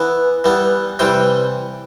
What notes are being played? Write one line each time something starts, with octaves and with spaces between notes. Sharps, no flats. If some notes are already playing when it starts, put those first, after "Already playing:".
Already playing: E3 B3
E3 G3 B3
C3 E3 G3 G5